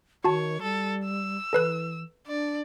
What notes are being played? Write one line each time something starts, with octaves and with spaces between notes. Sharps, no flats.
D#3 F#4 C#5 A5
G3 A4
E6
E3 A4 B4 F#6
D4 D5